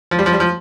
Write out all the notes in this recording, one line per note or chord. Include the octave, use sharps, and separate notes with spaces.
F3
G3
F3
G3
F3